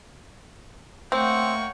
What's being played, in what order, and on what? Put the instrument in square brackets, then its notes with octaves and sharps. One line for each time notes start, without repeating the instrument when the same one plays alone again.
[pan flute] A3 [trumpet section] A#3 C#5 C#6 [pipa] C4 [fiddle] F#5 G5